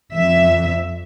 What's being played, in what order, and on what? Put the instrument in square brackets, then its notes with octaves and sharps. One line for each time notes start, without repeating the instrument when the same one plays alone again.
[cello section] F2 E5